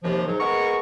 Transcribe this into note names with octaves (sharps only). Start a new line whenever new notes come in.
D#2 C3 F3
G#2 F#3
G#3 B3 G#4 A#4 A#5 C#6